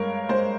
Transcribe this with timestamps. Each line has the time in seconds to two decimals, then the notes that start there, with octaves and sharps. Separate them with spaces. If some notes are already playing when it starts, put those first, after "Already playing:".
Already playing: G2 G#3 A#4 C#5 F5
0.29 G#3 C5